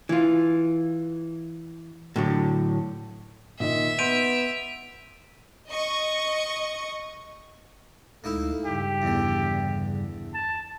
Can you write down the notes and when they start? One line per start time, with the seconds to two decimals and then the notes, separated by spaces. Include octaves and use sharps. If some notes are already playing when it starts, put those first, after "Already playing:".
0.09 E3 F4
2.16 A2 D3 F#3
3.60 A#2 D#3 D#5 E5
3.99 B3 C6 G6 D7 D#7 F7
5.69 D#5 C#6
8.24 D2 G#3 A#3 D#4 E4 A4
8.66 G2 C#3 G3 G4
9.02 E2 D3
10.34 A5